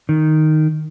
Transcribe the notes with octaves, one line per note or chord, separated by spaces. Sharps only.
D#3